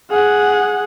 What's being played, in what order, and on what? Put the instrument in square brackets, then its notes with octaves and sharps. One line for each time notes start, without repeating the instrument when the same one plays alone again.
[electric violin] G#4 F#5